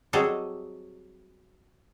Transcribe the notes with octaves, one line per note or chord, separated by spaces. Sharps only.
F#3 G3 C4 G#4 A4 D#5